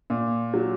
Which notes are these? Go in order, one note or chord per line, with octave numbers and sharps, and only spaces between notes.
A#2
F#3